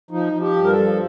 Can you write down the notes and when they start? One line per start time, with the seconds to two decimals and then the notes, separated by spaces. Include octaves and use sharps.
0.11 F3 D#4
0.33 F3
0.41 G4
0.56 G2
0.64 A#4
0.71 A4
0.79 F3